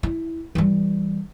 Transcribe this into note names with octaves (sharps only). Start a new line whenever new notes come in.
E4
E3 G3